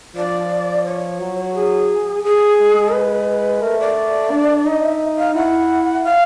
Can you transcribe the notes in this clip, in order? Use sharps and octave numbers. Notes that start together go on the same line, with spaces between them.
F3 D5
C#5
F#3
G#4
G#4
G#3
B4
A3 A#4
D5
D4
D#4 D#5
E5
F5
E4 F#5
F5